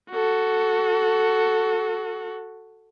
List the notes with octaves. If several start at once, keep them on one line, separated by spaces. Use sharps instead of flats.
F#4 A4